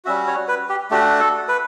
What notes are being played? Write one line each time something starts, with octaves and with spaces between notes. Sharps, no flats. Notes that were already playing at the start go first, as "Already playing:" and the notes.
G3 C#4 F#4 E5
C#5
B4
G4
A3 D4 F#4 G4
A4
B4